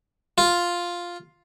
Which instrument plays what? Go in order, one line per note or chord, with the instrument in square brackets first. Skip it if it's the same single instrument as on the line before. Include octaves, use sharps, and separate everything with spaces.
[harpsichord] F4